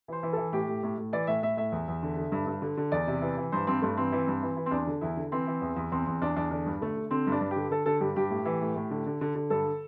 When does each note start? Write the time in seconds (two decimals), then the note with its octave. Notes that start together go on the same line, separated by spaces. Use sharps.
0.08 E3 C5
0.23 E3
0.33 E3 A4
0.53 A2 G4
0.68 A2
0.83 A2
0.98 A2
1.13 E3 D5
1.27 A2 E5
1.43 A2 E5
1.57 A2 E5
1.72 E2
1.88 E2
2.03 D3
2.17 D3
2.32 G2
2.47 G2
2.62 D3
2.77 D3
2.92 E2 D5
3.07 C3
3.22 E3
3.37 E3
3.52 G2 C5
3.67 G2 C4
3.82 G2 A3
3.97 E3 C4
4.12 E3
4.28 G2
4.43 E3
4.57 E3
4.66 C4
4.71 E2 D4
4.87 D3
5.01 E2 E4
5.17 D3
5.32 E3 C4
5.47 E3
5.62 E2
5.76 E2
5.92 E2 C4
6.06 E2 C4
6.21 E2 D4
6.36 E2 D4
6.51 D3 D4
6.66 G2
6.81 D3 A3
6.97 D3
7.11 D3 C4
7.27 G2 D4
7.41 G2
7.51 G4
7.56 D3
7.71 D3 A4
7.86 D3 A4
8.00 G2 G4
8.16 G2 G4
8.30 A2
8.45 E3
8.61 A2
8.76 A2
8.91 D3
9.06 D3
9.21 D3
9.35 D3
9.50 G2 A4